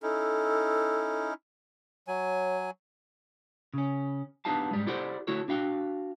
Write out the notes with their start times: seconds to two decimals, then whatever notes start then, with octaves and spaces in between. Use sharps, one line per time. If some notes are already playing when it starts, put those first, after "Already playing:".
0.03 C#4 D#4 E4 A4
2.08 F#3 C#5 G#5
3.74 C#3 C#4
4.45 B3 D4 D#4 G4 F5 A5
4.71 G#2 G3 G#3
4.87 E4 G4 A4 C5 D5 F#5
5.27 D3 A3 E4 F#4 A4 C#5
5.48 D4 F#4 F5 G5